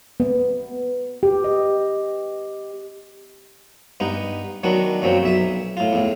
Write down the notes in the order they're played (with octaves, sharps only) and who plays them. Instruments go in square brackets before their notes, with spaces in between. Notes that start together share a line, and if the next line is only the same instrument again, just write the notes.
[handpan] B3
G4
D#5
[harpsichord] G2 B3 D#4
D#3 F#3 B3 D4
F#2 A#2 F#3 C4
B1 E5 D#6
A2 F4
E2 A2